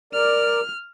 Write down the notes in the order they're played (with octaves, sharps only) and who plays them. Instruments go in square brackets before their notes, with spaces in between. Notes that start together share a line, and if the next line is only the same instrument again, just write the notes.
[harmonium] A#4 D5 [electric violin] F6